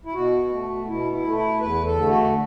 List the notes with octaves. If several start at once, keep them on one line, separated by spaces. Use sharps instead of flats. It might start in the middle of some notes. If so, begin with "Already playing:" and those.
E4
B2 F#4
A3
B2 E4
E4
A3
E4
E2 B4
A4
D3 A3
F#4